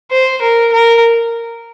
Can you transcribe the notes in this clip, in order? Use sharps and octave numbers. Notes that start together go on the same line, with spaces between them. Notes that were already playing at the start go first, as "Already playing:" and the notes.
C5
A#4
A#4